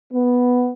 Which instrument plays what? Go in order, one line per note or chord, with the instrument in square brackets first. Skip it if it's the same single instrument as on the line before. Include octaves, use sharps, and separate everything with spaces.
[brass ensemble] B3